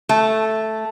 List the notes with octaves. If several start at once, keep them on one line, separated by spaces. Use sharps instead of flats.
A3